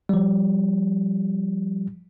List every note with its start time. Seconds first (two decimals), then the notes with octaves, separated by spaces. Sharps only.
0.09 F3 G3